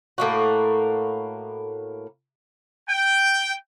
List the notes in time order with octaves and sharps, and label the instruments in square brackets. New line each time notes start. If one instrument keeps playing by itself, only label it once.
[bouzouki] A2 A#3 F#4
[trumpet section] G5